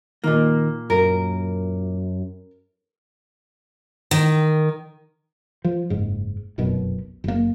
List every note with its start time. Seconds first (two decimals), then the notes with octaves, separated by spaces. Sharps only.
0.24 A#2 D#3 A#3
0.90 F#2 A#4
4.11 D#3
5.65 F3
5.90 F#1 G#2
6.58 F1 B1 F#2 B2
7.24 F#1 A#3